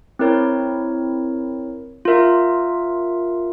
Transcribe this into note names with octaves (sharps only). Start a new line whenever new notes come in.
C4 E4 A#4 C#5
F4 A#4 E5